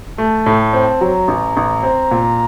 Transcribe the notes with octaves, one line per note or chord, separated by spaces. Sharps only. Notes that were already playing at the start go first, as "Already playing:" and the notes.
A3 A5
A2
A5
C4
F#3 A#5
A1
A1
C4
A#2